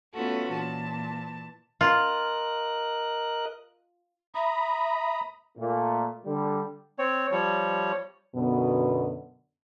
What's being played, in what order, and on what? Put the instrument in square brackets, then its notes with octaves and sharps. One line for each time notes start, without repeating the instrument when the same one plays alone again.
[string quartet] A3 B3 C#4 F4 F#4 A4
A#2 E3 A5
[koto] F4 [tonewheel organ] A#4 D#5 F#6
[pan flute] E5 [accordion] A#5 B5 D#6
[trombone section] A#2 A3
D3 G3
[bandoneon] C4 C#5
F3 G3 C#5
[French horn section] F#2 B2 D3 B3